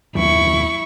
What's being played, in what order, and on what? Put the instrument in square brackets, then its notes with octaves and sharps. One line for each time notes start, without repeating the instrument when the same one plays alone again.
[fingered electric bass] F#1 D#2 F#3 [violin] E4 C#6